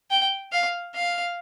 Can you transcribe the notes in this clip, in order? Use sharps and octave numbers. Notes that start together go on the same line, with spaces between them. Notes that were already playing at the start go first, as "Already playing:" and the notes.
G5
F5
F5